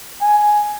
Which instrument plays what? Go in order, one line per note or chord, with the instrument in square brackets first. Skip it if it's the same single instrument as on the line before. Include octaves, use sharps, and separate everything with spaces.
[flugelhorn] G#5